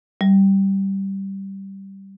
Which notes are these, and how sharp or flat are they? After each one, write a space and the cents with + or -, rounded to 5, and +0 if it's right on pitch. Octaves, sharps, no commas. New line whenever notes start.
G3 -10